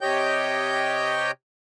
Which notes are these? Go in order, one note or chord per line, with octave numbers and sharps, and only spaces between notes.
C3 G4 C#5 D#5 G5 G6